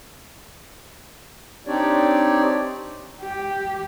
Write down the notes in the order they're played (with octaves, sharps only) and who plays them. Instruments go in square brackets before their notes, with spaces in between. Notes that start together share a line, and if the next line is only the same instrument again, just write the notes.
[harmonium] C4 D4 D#4 G4 C#5 D5
[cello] G4